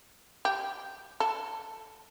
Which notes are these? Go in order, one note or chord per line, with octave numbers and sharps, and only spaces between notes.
G4
A4